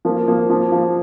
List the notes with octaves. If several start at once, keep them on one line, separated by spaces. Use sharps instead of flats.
F3 A#3
F3 A#3
F3
F3